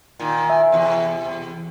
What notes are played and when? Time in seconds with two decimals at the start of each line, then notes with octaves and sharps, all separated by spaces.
0.20 A#2 D#3
0.50 E5 G#5
0.72 E2 C3